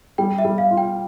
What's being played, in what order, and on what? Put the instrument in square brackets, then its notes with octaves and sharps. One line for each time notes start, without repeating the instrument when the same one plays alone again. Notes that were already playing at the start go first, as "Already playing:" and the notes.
[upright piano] G3 [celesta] G5
[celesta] E5
[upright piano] G3
[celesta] F5
[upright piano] F4
[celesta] G5